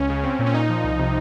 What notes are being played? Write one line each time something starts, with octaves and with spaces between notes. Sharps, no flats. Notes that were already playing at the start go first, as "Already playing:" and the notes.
Already playing: C#2 C#4
C#3
C4
A#2
C#4
A#2 D#4
F3
C2
C3